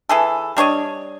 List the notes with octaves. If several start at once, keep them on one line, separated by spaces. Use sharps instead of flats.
E3 G#4 A4
G3 D4 C#5 D#5